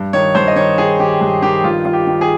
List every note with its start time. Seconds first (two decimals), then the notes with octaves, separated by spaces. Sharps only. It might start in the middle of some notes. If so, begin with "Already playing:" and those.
Already playing: G2
0.13 D#3 C#5
0.35 G2 C5
0.48 D#5
0.56 D#3 C#5
0.78 D#3 G#4
1.00 D#3 G4
1.21 G2 G4
1.42 D#3 G4
1.64 G2 F4
1.85 D#3 F4
1.93 G4
2.07 D#3
2.21 G#4